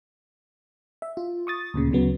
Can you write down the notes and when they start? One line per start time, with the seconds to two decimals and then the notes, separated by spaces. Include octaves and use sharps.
1.02 E5
1.17 F4
1.47 C#6 D#6 A6
1.74 D2 A#2 C#3
1.91 D2 C#3 F#3 B3